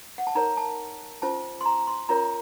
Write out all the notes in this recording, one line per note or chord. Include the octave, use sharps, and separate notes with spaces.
F#5
A5
D#4 A#4 C#5 A#5
A5
C#4 F4 C5 A5
C6
A#5
C6
C#4 F4 A#4 C#5 A#5